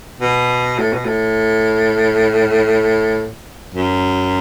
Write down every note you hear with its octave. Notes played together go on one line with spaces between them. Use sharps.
B2
A2
B2
A2
F#2